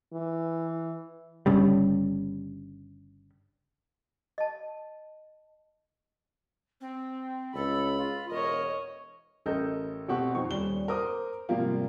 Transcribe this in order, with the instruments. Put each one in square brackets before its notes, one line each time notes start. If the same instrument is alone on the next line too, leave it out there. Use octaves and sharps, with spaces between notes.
[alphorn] E3
[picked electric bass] G1 G2 C#3 G3
[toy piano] D#5 A5
[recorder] C4
[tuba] C#2 [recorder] A4 [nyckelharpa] B5
[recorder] F4
[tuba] E1 [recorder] A#4 [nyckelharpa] C#5 D#5
[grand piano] A1 A4 A#4 D#5 G6
B2 A3 C4 G4 F#5 C#6
F2 D#4 C5 C#6
D#1 G3 G7
A#4 C5 D6 D#6
G#2 C3 F3 G3 A#3 F4